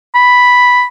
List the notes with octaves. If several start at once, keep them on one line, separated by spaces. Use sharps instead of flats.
B5